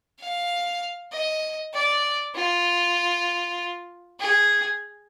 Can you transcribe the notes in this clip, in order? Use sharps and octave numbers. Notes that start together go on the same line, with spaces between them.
F5
D#5
D5
F4
G#4